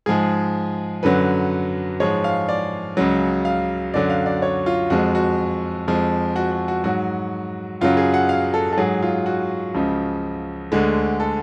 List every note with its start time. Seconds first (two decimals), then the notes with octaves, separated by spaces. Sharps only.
0.06 G#2 F3 G#3 G#4
1.03 F#2 D3 F#3 B4
2.00 G#2 F3 G#3 C#5
2.24 F5
2.49 D5
2.97 C#2 C#3 F#3
3.45 F5
3.94 F#2 D3 F#3 D5
4.10 F5
4.26 D5
4.42 C#5
4.66 F4
4.90 F2 F3 G#3 F#4
5.15 F#4
5.87 F2 F3 G#3
6.36 F#4
6.52 F#4
6.68 F#4
6.84 G#2 F#3 F#4
7.81 F#2 C#3 F#3 F4
7.97 G#4
8.14 F#5
8.29 F5
8.54 A4
8.73 A4
8.77 G#2 F#3 G#4
9.02 F4
9.26 F#4
9.74 C#2 C#3 F3
10.72 D2 D3 G#3
11.20 A4